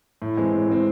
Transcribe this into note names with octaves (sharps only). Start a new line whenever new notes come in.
A2
E3 G#3 C4
A2
E3 G#3 C4